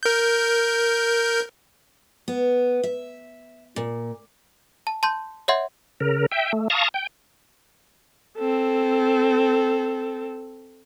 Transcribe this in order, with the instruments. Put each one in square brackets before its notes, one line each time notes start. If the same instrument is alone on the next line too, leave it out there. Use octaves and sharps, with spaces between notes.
[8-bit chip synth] A#4 G6
[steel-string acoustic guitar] B3
E5
A#2
[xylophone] A5
A5 C6 G6
C#5 D#5 E5 F#5 C6 G#6
[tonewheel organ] C#3 A#4
E5 G5
A3
F5 A5 A#5 C#6 D#6
G5
[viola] C4 A4